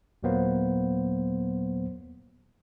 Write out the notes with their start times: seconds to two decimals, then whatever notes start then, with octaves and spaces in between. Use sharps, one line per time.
0.23 D#2 A#2 F#3 A#3 B3 C5